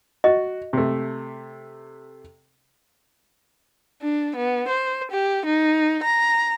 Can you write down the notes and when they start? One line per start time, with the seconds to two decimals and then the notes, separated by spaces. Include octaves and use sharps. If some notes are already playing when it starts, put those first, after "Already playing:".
0.24 F#4 D#5
0.73 C3 A3
4.02 D4
4.36 B3
4.68 C5
5.11 G4
5.46 D#4
6.03 A#5